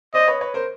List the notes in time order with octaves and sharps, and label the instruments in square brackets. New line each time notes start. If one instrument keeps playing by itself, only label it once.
[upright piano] C5 D5 [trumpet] D#5
[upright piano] B4 C#5
B4 C#5
A#4 C5